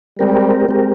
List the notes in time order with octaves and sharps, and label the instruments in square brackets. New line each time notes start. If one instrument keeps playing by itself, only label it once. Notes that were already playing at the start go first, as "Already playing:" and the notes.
[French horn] G3 [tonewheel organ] G#3 C4 G4 A#4
[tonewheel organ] G#3 C4 G4 A#4